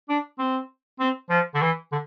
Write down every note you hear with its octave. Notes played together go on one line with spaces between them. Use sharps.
D4
C4
C4
F3
D3
E3
D3